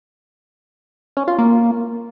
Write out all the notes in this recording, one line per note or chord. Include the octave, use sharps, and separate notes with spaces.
C#4
F4
A#3